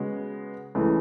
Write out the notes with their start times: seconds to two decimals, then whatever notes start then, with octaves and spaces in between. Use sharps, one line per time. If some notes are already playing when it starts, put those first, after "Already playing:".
Already playing: C#3 G#3 B3 F#4
0.75 C#2 C#3 E3 A3